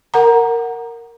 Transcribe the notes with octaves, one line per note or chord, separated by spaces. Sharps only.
A#4 F#5 A#5